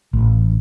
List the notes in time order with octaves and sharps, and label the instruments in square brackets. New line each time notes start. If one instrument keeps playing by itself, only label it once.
[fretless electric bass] A1